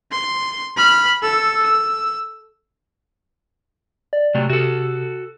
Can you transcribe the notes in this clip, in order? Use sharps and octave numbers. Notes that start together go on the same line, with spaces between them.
C6
B5 F6
A4 E6
E6
D5
C3 F#3 A3
C3 F#4 A4